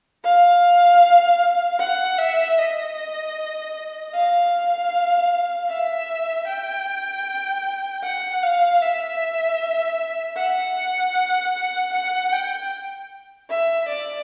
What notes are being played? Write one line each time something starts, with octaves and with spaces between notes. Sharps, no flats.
F5
F#5
E5
D#5
F5
E5
G5
F#5
F5
E5
F#5
F#5
G5
E5
D5